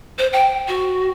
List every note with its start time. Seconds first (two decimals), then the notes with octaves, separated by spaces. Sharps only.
0.19 C5
0.33 G5
0.68 F#4